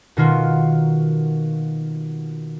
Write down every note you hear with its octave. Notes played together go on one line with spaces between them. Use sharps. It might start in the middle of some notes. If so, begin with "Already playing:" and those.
B2 D#3 A#3 F4 F#4